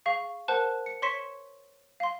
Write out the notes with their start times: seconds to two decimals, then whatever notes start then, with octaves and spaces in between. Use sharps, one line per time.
0.06 G#4 F5 C#6
0.48 A#4 C5 F#5 A5 F#6 E7
0.86 C#7
1.02 C#5 C6 C#6 B6 C#7 E7
2.00 F5 C6